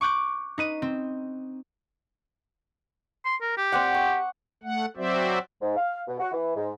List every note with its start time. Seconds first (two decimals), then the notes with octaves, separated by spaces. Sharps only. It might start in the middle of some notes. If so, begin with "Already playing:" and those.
0.01 C#6 D6 F#6 G6 D7
0.58 D#4 B4 D#7
0.82 C4
3.26 C6
3.41 A#4
3.58 G4
3.72 C4 D5 F#5
3.95 C#6
4.63 A3 F#5
4.97 F#3 C4 F#4 C5 D5 E5
5.62 G#2
5.77 F5
6.08 B2
6.19 F#4
6.32 E3
6.56 G#2